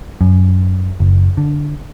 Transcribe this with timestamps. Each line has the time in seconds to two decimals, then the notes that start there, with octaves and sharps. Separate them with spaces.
0.21 F#2
1.00 F#1
1.37 D3